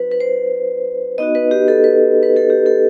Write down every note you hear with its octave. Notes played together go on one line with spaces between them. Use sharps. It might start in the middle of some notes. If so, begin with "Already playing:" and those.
Already playing: F#3 C4 D#4 F#4 B4 C5
B4
C5
B3 D#4 F#4 D#5
B4
G4
A4
B4
B4
A4
G4
A4